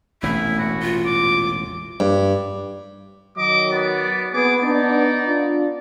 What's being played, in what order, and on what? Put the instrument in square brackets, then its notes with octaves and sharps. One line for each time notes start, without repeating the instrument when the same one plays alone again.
[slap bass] E1 A1 A#2 [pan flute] A3 [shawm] E4
[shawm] F#4
[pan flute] F4
[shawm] D6
[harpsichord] G2
[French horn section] D#3 F#3 [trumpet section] D#5 D6
[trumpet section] B3 D5
[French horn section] B3 [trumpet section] G#4 D6
[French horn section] B3 D4 [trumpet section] D#4 D5
[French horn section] D4 F4